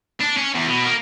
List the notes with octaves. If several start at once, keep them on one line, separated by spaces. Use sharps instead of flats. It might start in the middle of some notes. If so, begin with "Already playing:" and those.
D4
C#4
E2
B2
A#3